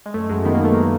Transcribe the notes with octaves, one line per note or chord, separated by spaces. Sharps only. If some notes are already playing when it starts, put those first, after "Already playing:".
G#3
F#2 A3
F#2 G#3
D#3 B3
A#3
D#3 A3
A#3